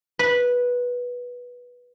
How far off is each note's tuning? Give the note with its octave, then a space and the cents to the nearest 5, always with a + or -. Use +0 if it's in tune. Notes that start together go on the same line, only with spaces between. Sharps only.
B4 -10